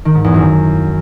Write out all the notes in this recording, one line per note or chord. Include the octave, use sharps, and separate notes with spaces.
D#3
G#2
E2
F#2